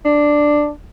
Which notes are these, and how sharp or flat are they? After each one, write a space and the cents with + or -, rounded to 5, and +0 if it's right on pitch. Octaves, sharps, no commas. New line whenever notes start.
D4 +5